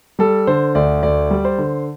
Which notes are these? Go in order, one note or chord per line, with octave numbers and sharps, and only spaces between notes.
G3 A4
D3 C5
D2 D5
D2 D5
G3
C5
D3